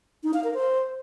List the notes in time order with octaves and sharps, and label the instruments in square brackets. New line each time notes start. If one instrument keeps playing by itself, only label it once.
[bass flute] D#4
F5
A#4
C5